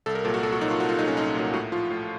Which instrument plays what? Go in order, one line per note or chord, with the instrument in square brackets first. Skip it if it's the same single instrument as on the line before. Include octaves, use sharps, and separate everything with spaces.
[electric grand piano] C2 A4
A#4
A#2 F#3 A4
F#4
C2 A4
F#4
A#2 F#3 D#4
F4
C2 F#4
F4
A#2 D#4
F#3
C#4
C2 D#4
A#2 F#3
A2 F#4
F3 F4
A2